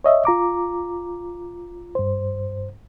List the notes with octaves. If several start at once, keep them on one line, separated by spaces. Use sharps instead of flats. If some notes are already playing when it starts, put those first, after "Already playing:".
C#5 D#5 E5
F4 A#5 D6
G2 C5